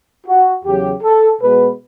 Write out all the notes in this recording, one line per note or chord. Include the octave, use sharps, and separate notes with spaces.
F#4
E2 C#3 F#3 G4
A4
B2 G#3 B3 B4